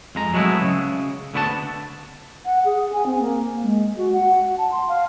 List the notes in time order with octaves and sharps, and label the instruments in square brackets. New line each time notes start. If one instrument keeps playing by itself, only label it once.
[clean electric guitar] F2 G#3 A#5
F#3 G#3 A3 B3 E4
C#3
D2 D3 B3 F#4 G4 A5
[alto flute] F#5
G#4
G#5
C4
A#3
G#3
F#4
F#5
A5
C6
F5